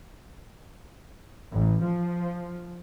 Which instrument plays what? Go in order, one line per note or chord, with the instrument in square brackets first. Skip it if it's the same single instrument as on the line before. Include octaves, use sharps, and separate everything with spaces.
[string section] A1
F3